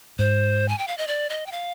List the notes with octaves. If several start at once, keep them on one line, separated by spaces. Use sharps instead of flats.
G#2 C5
G#5
G5
F5
D#5
D5
D#5
G5
F5